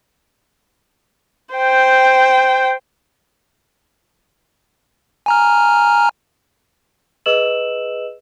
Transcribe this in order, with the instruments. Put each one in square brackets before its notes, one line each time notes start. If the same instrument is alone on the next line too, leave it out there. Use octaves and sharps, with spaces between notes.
[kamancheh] C5 G5
[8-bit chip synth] G#5 A#5 F6
[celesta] G#4 B4 D#5 E6 E7 F#7